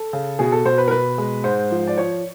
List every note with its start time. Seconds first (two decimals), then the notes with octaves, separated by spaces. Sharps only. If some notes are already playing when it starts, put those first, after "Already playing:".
Already playing: A4
0.13 C#3
0.39 B2 G#4
0.52 A4
0.65 B2 C5
0.78 B4
0.88 A#4
0.91 B2 B4
1.18 G#3
1.44 G#2 C5
1.71 F3
1.87 D5
1.98 F3 C#5